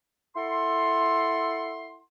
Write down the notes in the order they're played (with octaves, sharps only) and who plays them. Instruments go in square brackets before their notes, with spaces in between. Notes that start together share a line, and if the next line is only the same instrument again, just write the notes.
[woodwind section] E4 A4 F#5 C6